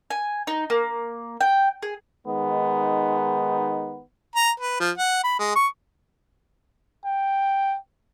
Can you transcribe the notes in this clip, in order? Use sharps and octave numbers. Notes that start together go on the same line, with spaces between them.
G#5
D#4
A#3
G5
G#4
D#3 G#3 B3 D#4
A#5
B4
F3
F#5
B5
G#3
C#6
G5